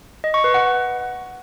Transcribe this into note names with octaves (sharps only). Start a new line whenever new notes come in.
D#5
C#6
B4
F#5